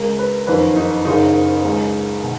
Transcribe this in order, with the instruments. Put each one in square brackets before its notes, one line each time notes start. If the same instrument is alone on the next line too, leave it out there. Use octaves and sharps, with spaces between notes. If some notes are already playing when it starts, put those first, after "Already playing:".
Already playing: [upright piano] C#2 C#3 A#4
B4
F#1 F2 D#3 B4
D#4
F#1 F#2 C#3 D#4
C#2 C#3
B2